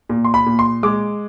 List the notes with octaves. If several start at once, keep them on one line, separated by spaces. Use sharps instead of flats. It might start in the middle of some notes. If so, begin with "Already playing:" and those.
A#2
C6
B5
A#2
C6
G#3 D6